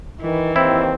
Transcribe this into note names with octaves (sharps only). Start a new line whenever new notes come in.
D#3 E3
D#2 C4 E4